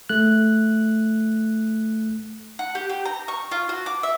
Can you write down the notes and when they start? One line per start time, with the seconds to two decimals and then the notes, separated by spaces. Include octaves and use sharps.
0.09 A3 F#6
2.59 F#5
2.75 G4
2.89 G4
3.05 A#5
3.28 C#6
3.51 F4
3.69 F#4
3.86 D6
4.03 E5